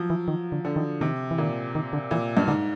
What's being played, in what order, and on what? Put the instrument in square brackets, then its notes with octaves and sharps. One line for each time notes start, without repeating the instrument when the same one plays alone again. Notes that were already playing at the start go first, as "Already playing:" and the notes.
Already playing: [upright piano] F3 F#3
[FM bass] E3
D#3
D3
[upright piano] D3
[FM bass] D#3
[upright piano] C3 [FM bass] D#3
[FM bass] E3
[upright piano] A#2 [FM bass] D#3
[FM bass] D#3
D3
[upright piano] A#2 [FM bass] E3
[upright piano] G2
[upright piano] G#2 [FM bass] D3